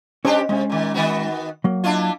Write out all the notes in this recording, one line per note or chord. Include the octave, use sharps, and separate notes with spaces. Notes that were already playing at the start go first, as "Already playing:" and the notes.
G3 C#4 D4 G4 C5 G#5
C3 G#3 C#4
A#2 D#3
D#3 B3 F#4
F#3 A#3
D4 E4 F4